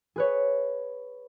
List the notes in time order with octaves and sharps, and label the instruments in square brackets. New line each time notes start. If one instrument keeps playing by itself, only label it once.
[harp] G#4 B4 C#5